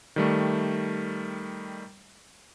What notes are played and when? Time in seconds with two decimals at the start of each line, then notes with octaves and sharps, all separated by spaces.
0.16 D#3 G3 A3